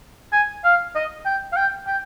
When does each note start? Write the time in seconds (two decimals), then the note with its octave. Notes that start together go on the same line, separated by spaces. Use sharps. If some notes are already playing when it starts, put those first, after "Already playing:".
0.33 G#5
0.64 F5
0.95 D#5
1.26 G5
1.52 F5
1.56 G5
1.87 G5